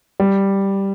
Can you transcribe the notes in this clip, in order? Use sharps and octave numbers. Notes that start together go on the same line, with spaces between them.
G3